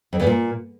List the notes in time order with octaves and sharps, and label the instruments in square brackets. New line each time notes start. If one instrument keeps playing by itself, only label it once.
[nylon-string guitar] F2
E2
A#2